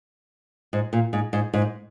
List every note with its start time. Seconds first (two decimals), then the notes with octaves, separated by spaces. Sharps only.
0.73 G#2
0.93 A#2
1.13 G#2
1.33 G#2
1.54 G#2